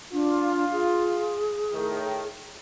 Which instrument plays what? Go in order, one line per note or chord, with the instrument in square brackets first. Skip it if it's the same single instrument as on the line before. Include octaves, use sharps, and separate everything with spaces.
[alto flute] D4 [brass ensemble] F4
[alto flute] G#4
[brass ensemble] A2 D#3